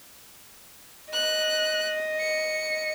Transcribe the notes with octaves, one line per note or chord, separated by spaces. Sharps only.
D#5 F#6
C#7